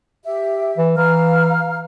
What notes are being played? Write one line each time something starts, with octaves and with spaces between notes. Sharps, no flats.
G4 E5
E3
E3 F5 A#5 F6